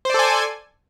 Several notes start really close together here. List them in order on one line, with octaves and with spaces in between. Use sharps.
C5 D5 A4 G#5